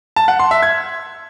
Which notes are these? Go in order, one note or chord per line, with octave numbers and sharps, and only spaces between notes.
A5
F#5
C6
E5
G#6